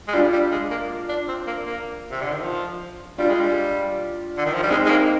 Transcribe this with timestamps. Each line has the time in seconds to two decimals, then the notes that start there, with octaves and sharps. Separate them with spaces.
0.08 G#3
0.13 G3 D4 F4
0.33 G3
0.52 G#3
0.71 A#3
1.09 D4
1.28 C4
1.47 A#3
1.66 A#3
2.11 C3
2.22 D3
2.32 D#3
2.42 F3
3.18 G3 D4 F4
3.29 G#3
3.41 G3
4.37 D3
4.46 D#3
4.54 F3
4.62 G3
4.70 G#3 C4 D#4
4.86 G#3
4.90 A#3